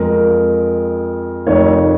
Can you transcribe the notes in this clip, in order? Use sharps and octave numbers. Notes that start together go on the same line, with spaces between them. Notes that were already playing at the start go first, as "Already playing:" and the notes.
Already playing: F2 F3 G#3 A#4
F1 F2 D#3 C#5